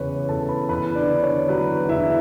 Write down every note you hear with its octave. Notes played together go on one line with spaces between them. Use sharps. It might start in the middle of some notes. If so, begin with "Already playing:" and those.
Already playing: E2 C#3 E3 B4 C#5
E2 A4 A5
B4 B5
E2 B4 B5
D4 D5
D3
C#5
F#3 B4
E2 E4 E5